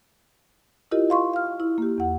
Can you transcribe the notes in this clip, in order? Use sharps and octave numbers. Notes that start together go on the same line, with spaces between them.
E4 F4 G4 A#4 D#5
F5 C6 C#6
F5 F6
E4
A#3 G4
E2 F#5